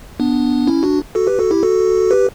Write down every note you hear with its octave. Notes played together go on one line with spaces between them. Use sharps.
B3 D4
C#4 E4
D4 F#4
F#4 A4
G4 B4
F#4 A4
E4 G4
F#4 A4
G4 B4